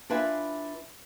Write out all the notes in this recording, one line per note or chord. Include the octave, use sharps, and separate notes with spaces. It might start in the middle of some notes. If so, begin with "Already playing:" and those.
D4 E4 F4 B4 E5 G#5